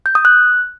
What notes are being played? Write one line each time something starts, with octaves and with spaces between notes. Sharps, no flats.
G6
D#6
F#6